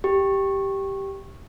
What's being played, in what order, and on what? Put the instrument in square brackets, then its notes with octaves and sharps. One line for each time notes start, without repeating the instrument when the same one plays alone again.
[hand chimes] G4